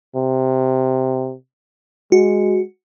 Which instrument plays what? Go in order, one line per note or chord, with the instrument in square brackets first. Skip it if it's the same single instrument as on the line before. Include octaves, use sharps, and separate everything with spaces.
[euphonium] C3
[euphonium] G#3 [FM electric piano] F#4